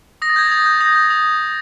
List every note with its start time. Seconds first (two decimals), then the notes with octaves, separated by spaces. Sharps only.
0.22 D#6 A#6
0.30 A6
0.36 G6 G#6
0.46 A6
0.51 D#6
0.66 G6
0.81 D#6 A#6
0.95 G6
1.10 D#6